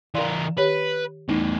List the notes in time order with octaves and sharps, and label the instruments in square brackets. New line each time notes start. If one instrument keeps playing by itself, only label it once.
[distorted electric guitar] E3 A#4 [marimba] D5 F5 C6
[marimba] D#3 G4 C#5 [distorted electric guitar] B4
[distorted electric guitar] E2 A2 [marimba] D#4